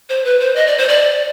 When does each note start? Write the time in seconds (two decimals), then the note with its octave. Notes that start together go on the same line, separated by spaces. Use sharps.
0.09 C5
0.25 B4
0.40 C5
0.56 D#5
0.67 D5
0.78 C5
0.89 D5